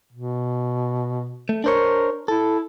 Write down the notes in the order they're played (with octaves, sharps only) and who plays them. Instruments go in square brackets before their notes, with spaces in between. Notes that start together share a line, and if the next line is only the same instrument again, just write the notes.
[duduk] B2
[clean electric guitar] A3
[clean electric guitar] D4 C5 C#5 [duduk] A#4
[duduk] E4 [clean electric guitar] A4